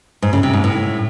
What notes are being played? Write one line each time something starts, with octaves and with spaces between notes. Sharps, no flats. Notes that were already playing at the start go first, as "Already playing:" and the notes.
G#2
C#3
C3
G#2
A2